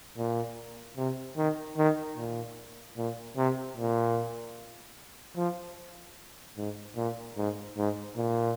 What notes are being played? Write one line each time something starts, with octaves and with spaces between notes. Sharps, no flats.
A#2
C3
D#3
D#3
A#2
A#2
C3
A#2
F3
G#2
A#2
G#2
G#2
A#2